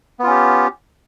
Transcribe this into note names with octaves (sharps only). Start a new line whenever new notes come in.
B3 C#4 F4 G4